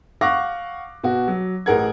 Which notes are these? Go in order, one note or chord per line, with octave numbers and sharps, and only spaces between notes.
F5 F#5 C#6 D6 F#6 A#6
B2 F#4
F#3
A1 G#4 A#4 F#5 G#6